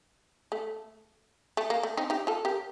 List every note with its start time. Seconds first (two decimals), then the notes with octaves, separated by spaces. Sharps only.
0.52 A3
1.57 A3
1.70 A#3
1.83 A3
1.97 C4 D#4
2.10 D#4 G4
2.27 F4 A4
2.45 G4 A#4